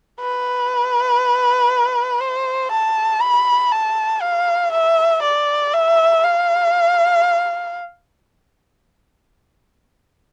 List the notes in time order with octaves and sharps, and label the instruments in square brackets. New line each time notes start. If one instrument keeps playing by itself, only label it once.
[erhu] B4
C5
A5
B5
A5
F5
E5
D5
E5
F5